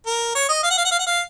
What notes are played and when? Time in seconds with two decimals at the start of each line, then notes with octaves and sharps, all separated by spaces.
0.06 A#4
0.35 C#5
0.49 D#5
0.63 F5
0.70 F#5
0.78 F5
0.85 F#5
0.92 F5
0.99 F#5
1.07 F5